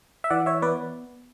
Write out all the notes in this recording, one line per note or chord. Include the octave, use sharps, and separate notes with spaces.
E5
E3 D5 F#5
C#5 E5
B3 B4 D5